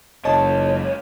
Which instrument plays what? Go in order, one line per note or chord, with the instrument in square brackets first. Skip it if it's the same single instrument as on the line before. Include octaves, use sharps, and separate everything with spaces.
[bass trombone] F#1 [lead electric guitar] C#2 C#5 [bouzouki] D#5 A5